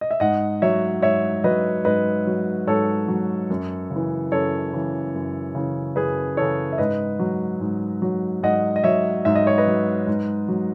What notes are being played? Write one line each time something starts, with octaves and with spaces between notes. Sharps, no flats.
D#5
E5
G#2 D#5 F#5
F#3 C#5 E5
G#2 C#5 E5
F#3 B4 D#5
G#2 B4 D#5
F#3
G#2 A4 C#5
F#3
F#2
C#3
E3
F#2 A4 C#5
C#3 E3
F#2
C#3 E3
F#2 G#4 B4
C#3 E3 A4 C#5
E5
G#2 B4 D#5
F#3
G#2
F#3
G#2 D#5 F#5
D#5
F#3 C#5 E5
G#2 E5
D#5
C#5
B4 D#5
F#3
G#2
F#3